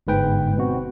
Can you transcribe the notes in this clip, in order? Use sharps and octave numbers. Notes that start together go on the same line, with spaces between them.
G1 G#2 B4 G5
B2 C4 F#4